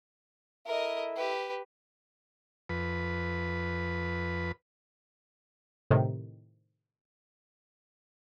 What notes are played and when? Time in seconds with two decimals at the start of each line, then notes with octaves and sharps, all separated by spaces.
0.67 E4 A4 A#4 D#5 E5
1.17 G4 B4
2.69 F2 B4
5.91 A2 C3 D#3